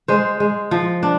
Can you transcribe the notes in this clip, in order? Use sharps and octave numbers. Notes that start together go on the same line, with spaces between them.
G#3 C5
G#3
F3
D4